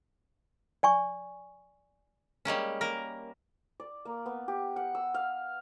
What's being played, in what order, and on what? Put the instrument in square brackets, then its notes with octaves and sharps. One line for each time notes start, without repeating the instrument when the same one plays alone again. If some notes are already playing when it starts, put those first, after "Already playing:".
[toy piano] D5 G#5 C#6
[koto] G3 G#3 A#3 C#4
A#3 A#4
[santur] D5
A#3
B3
G4
F#5
E6
F5